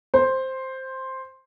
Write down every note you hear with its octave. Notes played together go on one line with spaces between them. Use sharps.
C5